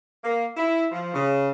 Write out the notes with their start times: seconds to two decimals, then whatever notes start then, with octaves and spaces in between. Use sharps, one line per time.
0.24 A#3
0.57 E4
0.92 F3
1.14 C#3